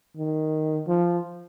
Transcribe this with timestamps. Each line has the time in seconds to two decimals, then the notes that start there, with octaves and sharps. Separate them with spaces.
0.17 D#3
0.88 F3